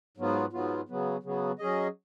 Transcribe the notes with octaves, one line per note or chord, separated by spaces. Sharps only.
G#2 F#3 B3 F4
G#2 F#3 B3 F4
C#3 F#3 B3
C#3 F#3 B3
F#3 C#4 G#4 D#5